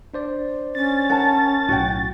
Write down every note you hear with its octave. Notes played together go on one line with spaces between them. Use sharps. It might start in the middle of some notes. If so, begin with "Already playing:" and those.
D4 C5 D5
C#4 A6
A#4 F#5 A5
B1 A2 F#4 G5 C#6